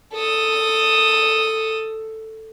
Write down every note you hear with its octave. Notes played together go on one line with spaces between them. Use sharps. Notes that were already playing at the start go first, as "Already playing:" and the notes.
A4 D#6